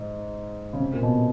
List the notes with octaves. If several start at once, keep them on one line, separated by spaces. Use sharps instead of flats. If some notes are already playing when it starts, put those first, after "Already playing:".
Already playing: G#2
C#3
C3
A#2
B2